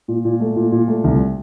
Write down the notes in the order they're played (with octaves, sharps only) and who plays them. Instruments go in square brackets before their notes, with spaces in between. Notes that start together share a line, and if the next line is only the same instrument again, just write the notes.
[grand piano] A#2
A#2
A3
A#2
A#2
A3
C2